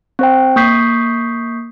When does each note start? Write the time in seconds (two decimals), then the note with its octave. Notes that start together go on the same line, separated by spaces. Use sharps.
0.19 C4 C5 G5
0.56 A#3 C#6 D#6 G6 B6 C7